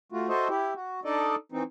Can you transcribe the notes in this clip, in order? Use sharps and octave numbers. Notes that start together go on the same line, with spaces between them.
A3 F4 F#4
F#4 A4 C5 D#5 E5
E4 G4
F#4
D4 D#4 A4 D5 D#5
E3 C4 D#4